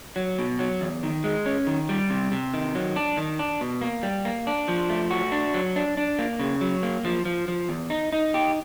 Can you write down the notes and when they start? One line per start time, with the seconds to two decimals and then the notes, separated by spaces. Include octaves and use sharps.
0.16 F#3
0.39 B2
0.59 F#3
0.81 E2
1.03 D#3
1.24 G#3
1.46 C#4
1.67 D#3
1.89 G3
2.10 C3
2.32 C3
2.54 D#3
2.75 F#3
2.96 D4
3.17 D#3
3.39 D4
3.61 B2
3.81 A#3
4.03 G3
4.25 A#3
4.47 D4
4.68 F3
4.90 A3
5.10 F#4
5.32 D4
5.54 F#3
5.76 D4
5.97 D4
6.19 A#3
6.39 C#3
6.61 F#3
6.83 A#3
7.05 F3
7.25 F3
7.48 F3
7.69 E2
7.90 D#4
8.13 D#4
8.34 G4